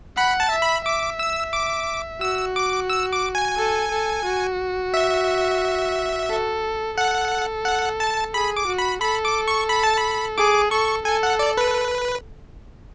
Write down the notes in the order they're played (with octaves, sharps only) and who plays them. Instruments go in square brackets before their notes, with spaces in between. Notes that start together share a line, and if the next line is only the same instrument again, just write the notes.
[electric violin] F#5 [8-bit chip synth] B5
[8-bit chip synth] A5
[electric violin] E5
[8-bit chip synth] B5
[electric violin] E5 [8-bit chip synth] D6
[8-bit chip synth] E6
D6
[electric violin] F#4 [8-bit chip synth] E6
[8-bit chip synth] D6
E6
D6
G#5
[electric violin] A4
A4
F#4
[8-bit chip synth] E5
[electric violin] A4
[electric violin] A4 [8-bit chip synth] F#5
[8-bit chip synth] F#5
A5
[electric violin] G#4 [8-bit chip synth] B5
[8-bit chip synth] D6
[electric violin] F#4
[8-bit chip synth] B5
[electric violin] A4 [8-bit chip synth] B5
[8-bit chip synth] D6
C#6
B5
A5
B5
[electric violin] G#4 [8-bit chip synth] D6
[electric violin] A4 [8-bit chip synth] C#6
[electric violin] A4 [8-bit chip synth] G#5
[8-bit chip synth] F#5
D5
B4